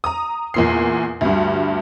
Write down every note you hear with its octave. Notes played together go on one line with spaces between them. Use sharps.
A#5 D#6
E2 A#2 C7
D2 G2